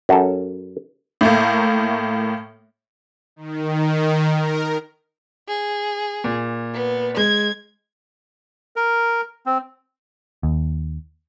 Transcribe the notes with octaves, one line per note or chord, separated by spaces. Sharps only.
F#2 C#4 A4
A2 A3 A#3
D#3
A#4
G#4
A#2
B3
G#3 G#6
A#4
C4
D#2